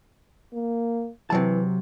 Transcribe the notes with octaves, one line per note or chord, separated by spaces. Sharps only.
A#3
C3 E3 F#3 A5